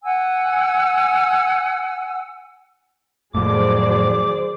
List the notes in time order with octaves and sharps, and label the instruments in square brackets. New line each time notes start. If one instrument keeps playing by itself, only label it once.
[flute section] F#5 G#5 E6
[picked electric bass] F2 A2 [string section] D#3 F#3 [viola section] G#4 C5 D5 [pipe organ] D6